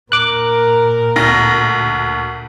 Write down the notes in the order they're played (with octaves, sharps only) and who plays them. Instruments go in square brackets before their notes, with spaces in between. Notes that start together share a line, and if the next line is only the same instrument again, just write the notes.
[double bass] A#2 [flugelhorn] A#4 [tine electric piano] D6 F#6
[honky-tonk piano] D2 A#6